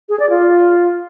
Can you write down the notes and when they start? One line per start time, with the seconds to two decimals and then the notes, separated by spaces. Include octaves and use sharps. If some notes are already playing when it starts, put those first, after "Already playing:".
0.09 G#4
0.20 D5
0.30 F4